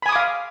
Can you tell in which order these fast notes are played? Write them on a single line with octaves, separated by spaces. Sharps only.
B5 G#5 D#6 D6 F5